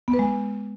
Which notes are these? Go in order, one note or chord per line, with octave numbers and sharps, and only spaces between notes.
B3
B4
G#3